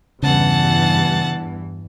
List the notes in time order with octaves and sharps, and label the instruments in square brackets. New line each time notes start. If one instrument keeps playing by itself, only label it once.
[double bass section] E2 G2 [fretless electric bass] C#3 [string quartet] E3 [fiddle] F#5 A5